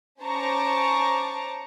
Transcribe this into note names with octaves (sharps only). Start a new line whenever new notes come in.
C#4 C5 A5 A#5 C#6 D6